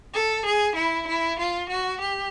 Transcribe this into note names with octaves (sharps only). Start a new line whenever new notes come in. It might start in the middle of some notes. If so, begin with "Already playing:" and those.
A4
G#4
E4
E4
F4
F#4
G4